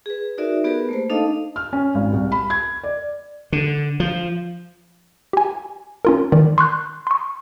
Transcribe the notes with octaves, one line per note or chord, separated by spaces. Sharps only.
G#4 B4
D#4 F#4 A#4 D5 E5
B3 G4 G#4 A#4 B4
A3 A#3 C5
D4 D#4 A4 D#5 F5 A5
F6
C#4
G#1
C2
B5
G#6
D5
D3
F3
G4 G#5
C#4 F4 A#4
D#3 E3 D5
C6 C#6 F#6 G6
C6 C#6